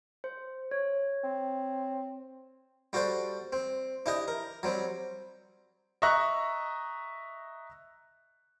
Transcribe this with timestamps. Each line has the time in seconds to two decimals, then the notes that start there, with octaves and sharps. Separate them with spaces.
0.24 C5
0.71 C#5
1.24 C4
2.93 G3 F#4 A4 C5 D5
3.53 C4
4.06 D4 E4 G4 D#5
4.28 A#4
4.63 F#3 G3 C4
6.02 D#5 E5 A#5 C#6 F#6